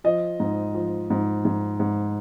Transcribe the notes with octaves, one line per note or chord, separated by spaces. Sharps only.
F3 D#5
G#2
F3
G#2
G#2
G#2